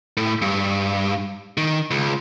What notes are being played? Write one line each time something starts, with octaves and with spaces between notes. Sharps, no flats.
A2
G2
D#3
C#2